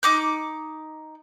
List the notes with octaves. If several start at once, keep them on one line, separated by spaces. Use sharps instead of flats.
D#4 D6 G6